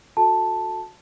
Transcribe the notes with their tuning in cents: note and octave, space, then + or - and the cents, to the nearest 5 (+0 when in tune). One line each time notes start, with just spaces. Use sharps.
F#4 -30 A4 +5 A5 +0